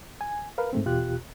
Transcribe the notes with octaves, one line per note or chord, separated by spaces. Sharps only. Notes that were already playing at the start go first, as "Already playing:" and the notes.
G#5
A#4 B4 F5
G#2 A3 C4
E2 B2 F4 G4 F#6